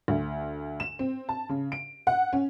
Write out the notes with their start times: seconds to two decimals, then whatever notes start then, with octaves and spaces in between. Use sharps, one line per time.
0.08 D2
0.80 E7
0.99 C4
1.29 A5
1.49 C#3
1.72 D7
2.07 F#5
2.33 C#4